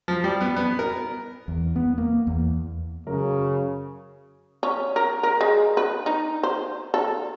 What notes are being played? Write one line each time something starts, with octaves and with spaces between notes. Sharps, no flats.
F3
G3
B3
B3
A#4
E2
B3
A#3
E2
F#2 C#3 A#4
C#4
A#4
A#4
G#3
B4
D#4
C5
A4